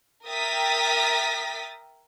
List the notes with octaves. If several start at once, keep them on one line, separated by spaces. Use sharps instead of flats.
A#4 E5 G5 D#6 A6 B6